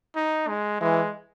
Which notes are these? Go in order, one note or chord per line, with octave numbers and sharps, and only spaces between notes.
D#4
G#3
E3 G#3